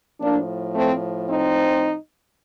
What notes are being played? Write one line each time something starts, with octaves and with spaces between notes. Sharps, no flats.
A2 F3 A#3 D4
A3 C4
C4 D#4